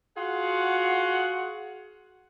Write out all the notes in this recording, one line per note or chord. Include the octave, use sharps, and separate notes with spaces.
F4 F#4 G#4 F#5